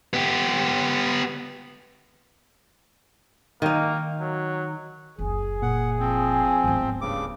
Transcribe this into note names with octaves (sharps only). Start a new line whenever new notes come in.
B3 G4
D#3 A#3 D#4
F#3
F#1 D2 G#4
A#2 F#5
F3 C4
D1 G#1 B3
G2 C#3 D6